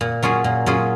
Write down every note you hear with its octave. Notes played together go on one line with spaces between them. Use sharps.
A#2
F#3 C#4 F4 G#4
A#2
F#3 C#4 F4 G#4